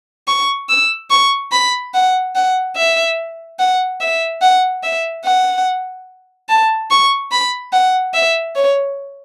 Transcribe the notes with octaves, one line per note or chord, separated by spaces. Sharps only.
C#6
E6
C#6
B5
F#5
F#5
E5
F#5
E5
F#5
E5
F#5
A5
C#6
B5
F#5
E5
C#5